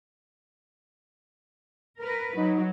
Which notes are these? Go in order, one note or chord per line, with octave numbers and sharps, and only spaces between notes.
A#4 B4
F#3 D#4